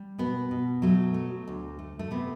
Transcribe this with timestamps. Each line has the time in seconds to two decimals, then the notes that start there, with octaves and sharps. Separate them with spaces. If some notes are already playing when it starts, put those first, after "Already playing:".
Already playing: G3
0.19 B2 B3
0.51 B2
0.82 F#3 A3
1.14 A3
1.48 D2
1.79 A3
1.99 A3
2.11 C3 B3